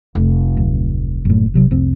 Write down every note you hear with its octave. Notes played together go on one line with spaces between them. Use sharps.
F1
D1
F#1 A2
B1 C3 F#3
F1 C2 C4